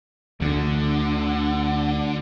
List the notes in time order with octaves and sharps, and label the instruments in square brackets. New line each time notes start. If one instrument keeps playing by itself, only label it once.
[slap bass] D2 [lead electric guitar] D3